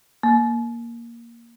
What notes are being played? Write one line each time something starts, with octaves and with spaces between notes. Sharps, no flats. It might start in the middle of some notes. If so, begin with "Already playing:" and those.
A#3